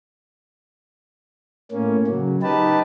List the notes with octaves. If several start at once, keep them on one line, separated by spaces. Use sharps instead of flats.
A2 A#3 C#4
C#3 F#3
D#4 G4 B4 A5